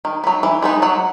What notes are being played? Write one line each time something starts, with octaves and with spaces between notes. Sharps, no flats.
D#3
F#3 B3
E3
G#3 B3 D#4
F#3 F#5